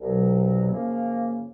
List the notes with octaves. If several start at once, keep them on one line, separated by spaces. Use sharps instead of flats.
C2 B2 F#3
F#2 C#3 F3 A#3